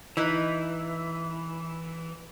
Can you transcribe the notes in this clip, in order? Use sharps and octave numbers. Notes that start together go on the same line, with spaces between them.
E3 D#4 E4 B4